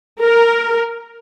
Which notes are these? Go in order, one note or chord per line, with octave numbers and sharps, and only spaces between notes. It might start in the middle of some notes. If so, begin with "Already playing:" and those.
A#4